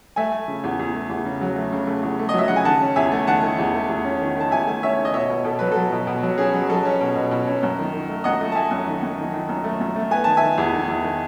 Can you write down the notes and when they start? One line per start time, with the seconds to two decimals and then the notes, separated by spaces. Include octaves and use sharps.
0.16 A3 E5 G#5
0.32 A3
0.48 C#3
0.64 E2
0.79 E2
0.94 A3
1.10 E2
1.25 C#3
1.41 F#3
1.56 A3
1.73 C#3
1.87 A3
2.03 E2
2.19 A3
2.29 D#5
2.34 F#3 E5
2.48 C#3 F#5
2.56 G#5
2.65 D#3 F#5 A5
2.81 C#4
2.96 E2 E5 G#5
3.12 A3
3.27 D#3 F#5 A5
3.43 D#3
3.59 E2
3.74 A3
3.89 E2
4.05 C#4
4.21 D#3
4.37 D#3 A5
4.51 E2 E5 G#5
4.67 A3
4.83 C#4 C#5 E5
4.99 D#3
5.05 D#5
5.14 B2 C#5 E5
5.30 B2
5.44 B2 A4
5.59 F#3 B4
5.72 F#3 A4
5.92 B2
6.07 B2
6.23 F#3
6.38 C#4 G#4
6.54 F#3
6.69 F#3 A4
6.85 C#4
7.00 B2
7.16 B2
7.31 B2
7.48 C#4
7.63 F#2
7.79 D#3
7.94 D#3
8.09 A3
8.24 F#2 D#5 F#5
8.41 A3
8.52 A5
8.55 A3 E5 G#5
8.71 F#2
8.87 D#3
9.02 F#2
9.18 D#3
9.33 D#3
9.49 F#2
9.64 A3
9.80 F#2
9.96 A3
10.11 B3 G#5
10.24 D#3 A5
10.37 E5 G#5
10.43 D#3
10.58 E2
10.74 D#3
10.88 E2
11.04 D#3